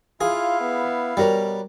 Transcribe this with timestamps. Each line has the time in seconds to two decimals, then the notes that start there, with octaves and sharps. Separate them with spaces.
0.21 E4 F4 G#4 F5
0.61 B3
1.17 B2 G3 F#4 A#4 C#5